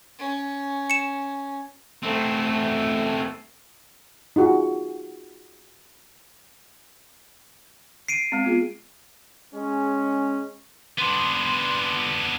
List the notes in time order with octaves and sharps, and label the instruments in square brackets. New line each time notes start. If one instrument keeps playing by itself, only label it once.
[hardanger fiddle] C#4
[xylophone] C#7 E7
[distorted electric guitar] A3 C4
[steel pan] D#4 F4 F#4 G#4
[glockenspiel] C7 D7 D#7
[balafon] G#3 C4
B3 F4 G#4
[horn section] G#3 C#4
[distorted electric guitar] B3 D4 [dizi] C6